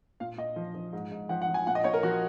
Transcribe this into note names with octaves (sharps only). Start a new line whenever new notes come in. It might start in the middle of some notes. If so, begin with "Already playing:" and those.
A#2 F5
A#2 D#5
F3
F3
G#2
G#2
F3 F#5
F#5
F3
G#5
A#2 F#5
D#5
A#2 C#5
A#4
F3 F#4